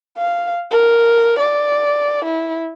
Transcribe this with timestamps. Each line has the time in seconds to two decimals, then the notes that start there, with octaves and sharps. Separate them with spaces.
0.17 F5
0.71 A#4
1.39 D5
2.25 E4